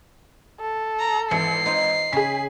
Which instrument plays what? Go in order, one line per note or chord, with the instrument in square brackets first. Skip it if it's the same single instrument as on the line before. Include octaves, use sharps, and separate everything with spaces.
[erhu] A4
[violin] A#5
[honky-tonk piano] G#1 C#7 [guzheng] E3 [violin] C7
[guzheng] D#4 F4 C5
[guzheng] C#3 [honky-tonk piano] G#4 B6 [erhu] G#5